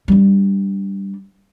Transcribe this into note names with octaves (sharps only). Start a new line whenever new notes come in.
G3 D4